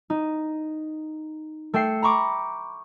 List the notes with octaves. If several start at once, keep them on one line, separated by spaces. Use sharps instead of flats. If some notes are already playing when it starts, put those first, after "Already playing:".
D#4
A3 G5 E6 C7 C#7
A#5 B5 C#6 D6